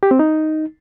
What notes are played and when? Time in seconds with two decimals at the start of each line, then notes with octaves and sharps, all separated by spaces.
0.03 G4
0.11 C4
0.19 D#4